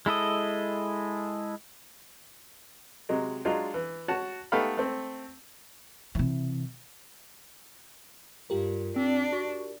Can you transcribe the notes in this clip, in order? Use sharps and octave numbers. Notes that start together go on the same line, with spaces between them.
G#3 E4 A4 D#5
C3 F#3 G#3
F#3 G#3 D4 F4
E3
F#4 C#5 A5
A3 B3 D#4 G4 F5 B5
A3 C4
C3 E3
G2 F4 G4 A#4
C4 D4
F#4